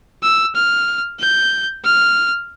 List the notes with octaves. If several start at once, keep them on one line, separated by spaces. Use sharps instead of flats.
E6
F6
G6
F6